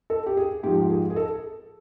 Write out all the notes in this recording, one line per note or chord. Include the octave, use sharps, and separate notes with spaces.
A4
G4
G#4
G#2 F3 G4
G4
G#4
G#4
A4